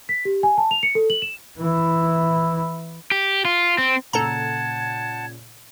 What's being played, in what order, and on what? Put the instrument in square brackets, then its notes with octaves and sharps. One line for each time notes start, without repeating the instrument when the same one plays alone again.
[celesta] B6
G4
G#5
A5
F7
C#7
A4
F#7
E7
[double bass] E3 E4
[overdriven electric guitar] G4
F4
C4
[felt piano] A#2 C#3 [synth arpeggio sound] A4 A#5 [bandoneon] F#5 A5 [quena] G#6